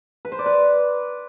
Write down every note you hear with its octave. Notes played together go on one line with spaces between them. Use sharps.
B4
C5
D5
B4